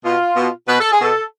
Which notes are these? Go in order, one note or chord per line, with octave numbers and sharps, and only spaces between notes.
B2 F4
B2
B2 B4
A4
G#4
B2 A4